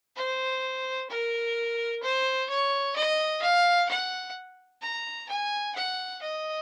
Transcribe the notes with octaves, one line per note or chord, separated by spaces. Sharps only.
C5
A#4
C5
C#5
D#5
F5
F#5
A#5
G#5
F#5
D#5